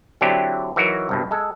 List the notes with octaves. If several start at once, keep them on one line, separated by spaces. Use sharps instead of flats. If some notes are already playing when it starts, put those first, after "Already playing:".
D3 F#3 C4 D4 E4 G4
E3 F#3 D#4 F#4 A#4
C2 G2 B2
G#3 A4